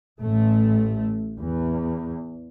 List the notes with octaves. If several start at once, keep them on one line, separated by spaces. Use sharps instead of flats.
A1 A3
E2